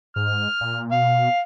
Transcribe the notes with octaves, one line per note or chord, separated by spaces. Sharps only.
G#2 F6
A#2
B2 F5